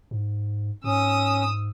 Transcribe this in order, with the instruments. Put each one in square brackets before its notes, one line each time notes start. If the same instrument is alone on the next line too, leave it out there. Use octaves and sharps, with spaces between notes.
[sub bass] G#2
[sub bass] G#2 [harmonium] C#4 [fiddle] D#6 E6